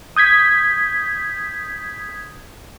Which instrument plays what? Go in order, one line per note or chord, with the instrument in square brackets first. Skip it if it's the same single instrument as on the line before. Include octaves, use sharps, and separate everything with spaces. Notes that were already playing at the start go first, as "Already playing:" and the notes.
[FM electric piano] D#6 G6 G#6 B6